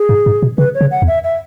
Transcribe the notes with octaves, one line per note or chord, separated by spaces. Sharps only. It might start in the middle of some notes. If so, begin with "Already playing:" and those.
Already playing: G#4
G#2
G#2
B2
C#3 B4
C#5
C#3
F#5
E2
E5
E5